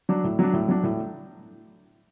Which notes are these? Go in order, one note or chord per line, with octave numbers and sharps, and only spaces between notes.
F#3 D4
A2
F#3 D4
A2
F#3 D4
A2